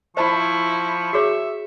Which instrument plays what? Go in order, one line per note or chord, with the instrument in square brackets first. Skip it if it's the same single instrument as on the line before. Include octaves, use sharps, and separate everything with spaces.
[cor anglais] F3 [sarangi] E4 [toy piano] C5 A5 B5 [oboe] C#6
[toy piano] F#4 G#4 C#5 [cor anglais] E5